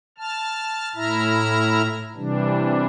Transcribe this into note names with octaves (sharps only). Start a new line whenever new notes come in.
A5 F6
A2 E4 E5 A#5 F6
C3 E3 G3 D4